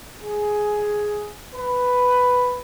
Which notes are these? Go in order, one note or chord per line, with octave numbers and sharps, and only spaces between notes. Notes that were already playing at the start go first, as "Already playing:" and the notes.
G#4
B4